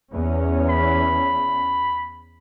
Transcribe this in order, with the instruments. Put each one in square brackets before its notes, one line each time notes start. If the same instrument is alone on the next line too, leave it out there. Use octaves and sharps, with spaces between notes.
[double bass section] E2 C#4
[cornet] B5